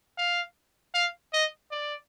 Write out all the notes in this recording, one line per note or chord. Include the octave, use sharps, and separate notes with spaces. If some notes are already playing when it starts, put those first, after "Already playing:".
F5
F5
D#5
D5